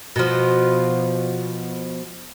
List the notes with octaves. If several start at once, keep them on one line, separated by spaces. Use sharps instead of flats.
B2 F3